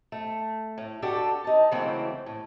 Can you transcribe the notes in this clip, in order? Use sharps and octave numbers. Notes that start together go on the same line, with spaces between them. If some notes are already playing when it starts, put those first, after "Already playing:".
A3
A2
D4 F#4 G4 A4
D#4 A5
C#3 E3 F#3 A3 A#3 C4
A2